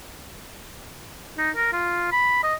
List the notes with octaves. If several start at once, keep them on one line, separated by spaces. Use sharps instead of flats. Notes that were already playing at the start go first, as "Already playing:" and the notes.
D#4
A#4
F4
B5
D#5